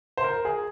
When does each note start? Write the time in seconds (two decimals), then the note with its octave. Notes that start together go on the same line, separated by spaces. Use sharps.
0.17 C5
0.24 A#4
0.45 G#4